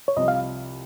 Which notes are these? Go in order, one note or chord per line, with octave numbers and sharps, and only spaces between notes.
C#5
C2 C3 F3 C4 D#5
F5